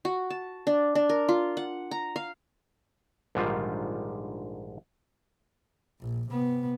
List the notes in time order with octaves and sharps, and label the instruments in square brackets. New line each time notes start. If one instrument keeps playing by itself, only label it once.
[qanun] F#4
A5
D4
D4
A#4
F4
F#5
A#5
F5
[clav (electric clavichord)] A#1 G#2 D3 D#3 G3 F4
[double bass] A#1
C3 B3